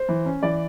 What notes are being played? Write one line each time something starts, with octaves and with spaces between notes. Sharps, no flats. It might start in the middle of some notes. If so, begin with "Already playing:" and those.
Already playing: C5
E3
C#4
E3 D5